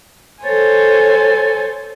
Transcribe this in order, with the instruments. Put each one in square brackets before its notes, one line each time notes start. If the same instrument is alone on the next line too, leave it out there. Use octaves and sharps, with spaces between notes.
[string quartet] A4 C5 C#5 G#5